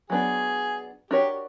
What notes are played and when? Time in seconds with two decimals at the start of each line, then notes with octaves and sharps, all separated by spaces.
0.10 F#3 B3 D4 G#4
1.11 D4 F#4 G4 A#4 C#5